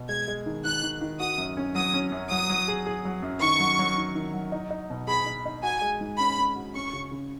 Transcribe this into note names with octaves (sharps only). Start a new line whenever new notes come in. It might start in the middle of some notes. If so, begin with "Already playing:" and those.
Already playing: B2
G#3 G#6
G#3
D#3
D#3 F#6
D#3
D#3
F#4 D#6
F#2
C#4
F#3 D#6
C#4
F#2
F#3 D#6
F#3
G#4
G#4
F#3
F#2
D#3 C#6
F#3
F#3
D#3
D#3
F#3
D#4
D#4
B2
G#4 B5
D#4
D#4
F#4 G#5
G#3
G#2
C#4 B5
C#4
F#4
C#4 C#6
C#3
C#3